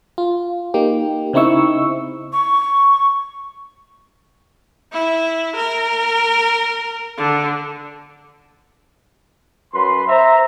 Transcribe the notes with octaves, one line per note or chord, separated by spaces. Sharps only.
F4
A#3 D#4 G4
C#3 C4 D#4 E4 C#6 E6
C#6
E4
A#4
D3
F#2 B4 C6
C5 E5 A#5